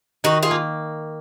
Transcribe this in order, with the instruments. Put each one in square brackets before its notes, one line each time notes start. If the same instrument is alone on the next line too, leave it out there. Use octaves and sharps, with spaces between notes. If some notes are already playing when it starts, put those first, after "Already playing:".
[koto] D#3 [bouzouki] D#4 F#4
[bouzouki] F4 G#4
[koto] A#3